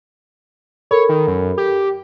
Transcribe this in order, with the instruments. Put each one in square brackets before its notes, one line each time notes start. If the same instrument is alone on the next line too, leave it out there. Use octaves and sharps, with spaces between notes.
[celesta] A4 A#4 B5 [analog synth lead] C#5
[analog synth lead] D#3
F#2
G4